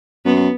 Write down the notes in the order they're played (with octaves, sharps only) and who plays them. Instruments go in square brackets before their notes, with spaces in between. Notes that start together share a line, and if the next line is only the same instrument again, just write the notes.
[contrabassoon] F#2 [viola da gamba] B3